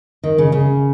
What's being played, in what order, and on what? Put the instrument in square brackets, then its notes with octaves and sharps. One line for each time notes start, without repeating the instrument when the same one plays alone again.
[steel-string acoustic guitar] D#3
C#3
C#3